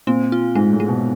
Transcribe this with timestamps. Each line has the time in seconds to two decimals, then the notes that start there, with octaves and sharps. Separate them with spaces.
0.07 A#2 C4
0.32 F4
0.55 G#2 G#3
0.72 A2
0.80 G#3
0.88 B2